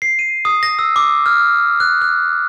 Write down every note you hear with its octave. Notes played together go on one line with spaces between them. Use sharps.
C7
D#7
D#6
A#6
E6
D6
F6
F#6
F#6